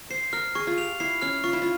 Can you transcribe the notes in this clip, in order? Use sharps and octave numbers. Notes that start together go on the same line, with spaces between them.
C5 C7
A#4 F6
G#4 C#6
F4
G4 F7
E4 C7
C#4 F6
F4 C#6
E4
F4